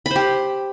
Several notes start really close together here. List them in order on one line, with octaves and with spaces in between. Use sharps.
B5 C5 G4